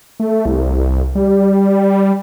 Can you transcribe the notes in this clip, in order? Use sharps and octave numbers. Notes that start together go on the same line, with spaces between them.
A3
C2
G3